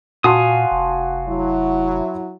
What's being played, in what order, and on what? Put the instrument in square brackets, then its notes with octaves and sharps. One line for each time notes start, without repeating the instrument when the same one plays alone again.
[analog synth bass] A#2 [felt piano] F#4 A5 C6 [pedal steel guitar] F5 G#5 D#6
[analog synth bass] F1
[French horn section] F#3 E4